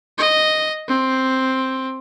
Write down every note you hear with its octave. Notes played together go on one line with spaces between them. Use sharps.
D#5
C4